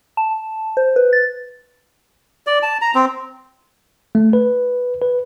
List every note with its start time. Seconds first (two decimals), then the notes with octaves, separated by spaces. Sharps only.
0.17 A5
0.77 C5
0.96 B4
1.13 A6
2.47 D5
2.63 A5
2.82 A#5
2.95 C4
4.15 A3
4.33 B4
5.02 B4